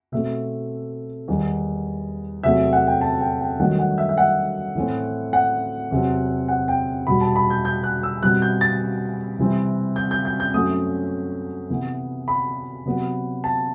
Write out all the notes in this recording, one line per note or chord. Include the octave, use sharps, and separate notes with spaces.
B2 A3 C4 E5
E2 D#3 G3
E2 C3 F#3 A3 C4 E5
F#5
G5
A5
G5
G5
G2 D#3 F#3 A3 F#5
F#5
E5
E5
F#5
A2 E3 A3 C4
F#5
E2 C3 F#3 C4
F#5
G5
E2 B2 G3 B5
A5
B5
G6
G6
F#6
E6
B2 G3 C4 F#6
G6
A6
C3 E3 G3 C4
G6
G6
G6
G6
F#2 F#3 A3 C4 D#6
C3 E3 B3
B5
C3 F#3 B3
A5